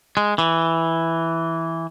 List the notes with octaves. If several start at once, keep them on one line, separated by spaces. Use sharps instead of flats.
G#3
E3